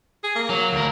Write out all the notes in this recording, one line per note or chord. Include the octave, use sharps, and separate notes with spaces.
G#4
A#3
F#3
D2 A#4